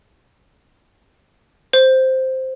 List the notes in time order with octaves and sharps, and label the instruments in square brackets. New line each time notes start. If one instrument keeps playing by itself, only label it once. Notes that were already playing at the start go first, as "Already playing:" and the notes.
[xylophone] C5